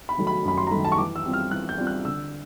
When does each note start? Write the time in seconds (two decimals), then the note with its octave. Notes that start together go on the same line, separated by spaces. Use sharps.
0.09 B5
0.18 D#3 F#3 A3
0.27 B5
0.45 F#2 B5
0.58 C6
0.67 A#5
0.71 D#3 F#3 A3 B5
0.85 A5
0.92 C#6
0.97 E3 D6
1.16 E6
1.25 G3 C4 F4
1.33 F6
1.51 E3 F#6
1.69 G6
1.78 G3 C4 F4
1.87 F#6
2.05 D3 E6